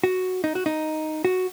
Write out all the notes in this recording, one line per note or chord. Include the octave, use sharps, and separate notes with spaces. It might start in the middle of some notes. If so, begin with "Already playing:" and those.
F#4
D#4
F#4
D#4
F#4